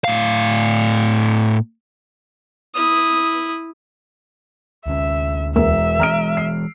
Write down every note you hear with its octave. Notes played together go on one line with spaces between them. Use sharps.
A2 F5
E4 D#6
D2 C#4 E5
E1 A#4 E5 E6
E3 G#3 A#5 F6 D7
C7